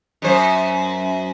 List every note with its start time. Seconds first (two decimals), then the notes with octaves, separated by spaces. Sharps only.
0.22 F#2 C5